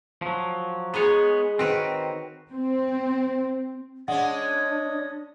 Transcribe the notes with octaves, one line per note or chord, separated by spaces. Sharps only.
F3 F#3
G#3 B3 D#4 G#4 C#5
D#3 C4 F#4 B4 C#5
C4
G#3 C#4 D4 D5 D#5 F#5 D#6